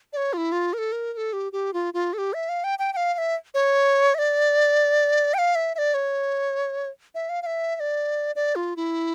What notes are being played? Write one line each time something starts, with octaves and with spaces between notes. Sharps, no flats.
D5
C#5
F4
E4
F4
A#4
A4
A#4
A#4
A4
G4
G4
F4
F4
A4
G4
E5
F5
G5
G5
G5
F5
F5
E5
C#5
E5
D5
G5
F5
E5
E5
D5
C#5
E5
F5
F5
E5
E5
D5
D5
F4
E4